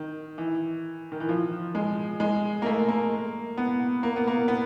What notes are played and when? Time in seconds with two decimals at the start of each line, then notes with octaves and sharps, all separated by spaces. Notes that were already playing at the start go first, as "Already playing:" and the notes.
Already playing: D#3
0.38 E3
1.12 D#3
1.20 E3
1.29 F3
1.75 G#3
2.20 G#3
2.62 A#3
2.66 A3
2.88 A#3
3.57 B3
4.03 A#3
4.16 B3
4.28 A#3
4.48 B3